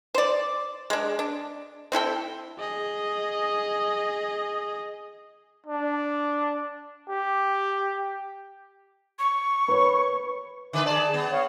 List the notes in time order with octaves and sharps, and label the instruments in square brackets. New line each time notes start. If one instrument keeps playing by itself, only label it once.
[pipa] C5 D5
G#3 D4
D4
C4 E4 A4 G5
[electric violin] G#4 D#5
[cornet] D4
G4
[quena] C#6
[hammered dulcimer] B4 C#5
[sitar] D3 B4 [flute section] D#4 E5 D6
[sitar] G#4 D5 [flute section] A5
[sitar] B3
[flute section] C#5 F5